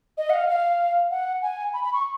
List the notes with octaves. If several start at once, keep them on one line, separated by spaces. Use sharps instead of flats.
D#5
F#5
F5
F5
F#5
G#5
B5
B5
C#6